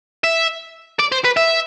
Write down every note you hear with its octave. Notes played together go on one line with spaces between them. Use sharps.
E5
D5
C5
B4
E5